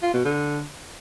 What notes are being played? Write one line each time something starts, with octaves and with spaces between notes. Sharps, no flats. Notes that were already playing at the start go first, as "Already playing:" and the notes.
F4
B2
D3